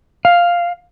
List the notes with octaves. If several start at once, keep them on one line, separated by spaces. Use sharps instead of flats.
F5